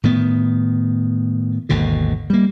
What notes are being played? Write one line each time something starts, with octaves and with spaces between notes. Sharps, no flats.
A2 D#3 B3
G#1 D#2 B2 D3
G3 A#3